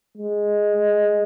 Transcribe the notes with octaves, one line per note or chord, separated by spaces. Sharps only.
G#3